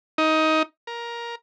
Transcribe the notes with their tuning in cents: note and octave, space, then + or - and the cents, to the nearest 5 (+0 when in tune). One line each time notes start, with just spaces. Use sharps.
D#4 +15
A#4 +15